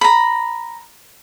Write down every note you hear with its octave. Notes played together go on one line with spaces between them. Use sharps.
A#5 B5